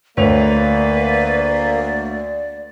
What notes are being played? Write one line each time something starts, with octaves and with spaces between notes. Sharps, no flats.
D2 A#3 B4 C#5 D5 F7